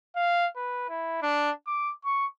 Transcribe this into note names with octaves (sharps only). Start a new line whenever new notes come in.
F5
B4
E4
D4
D6
C#6